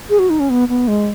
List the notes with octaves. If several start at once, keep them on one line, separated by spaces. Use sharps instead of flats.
G#4
F#4
D#4
C#4
B3
B3
G#3